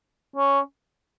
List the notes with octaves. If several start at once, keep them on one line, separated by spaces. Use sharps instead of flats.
C#4